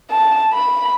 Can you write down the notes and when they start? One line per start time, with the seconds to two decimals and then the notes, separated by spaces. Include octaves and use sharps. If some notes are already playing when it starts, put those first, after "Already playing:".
0.10 A5
0.53 B5